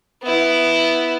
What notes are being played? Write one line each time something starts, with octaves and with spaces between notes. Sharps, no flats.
B3 E4